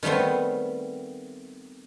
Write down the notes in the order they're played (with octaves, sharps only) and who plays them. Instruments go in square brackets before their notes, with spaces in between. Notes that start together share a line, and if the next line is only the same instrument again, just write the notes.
[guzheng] D#3 G3 A3 B3 C4